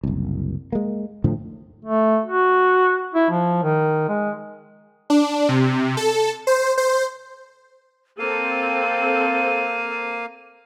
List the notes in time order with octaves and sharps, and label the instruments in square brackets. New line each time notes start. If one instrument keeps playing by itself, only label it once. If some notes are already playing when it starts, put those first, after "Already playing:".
[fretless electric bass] F#1 C2
G#3 A#3
A2 D3 F3
[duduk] A3
F#4
E4
F3
D#3
G#3
[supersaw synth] D4
C3
A4
C5
C5
[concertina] A#3 F5 [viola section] C4 A4 [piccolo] D#7